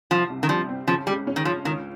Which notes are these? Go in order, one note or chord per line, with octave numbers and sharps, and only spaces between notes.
C2 F3
C3
D#3
F3 G3
C4
C#3 F3
G3 G#3
C#4
D#3
F3 F4
C#2 D#3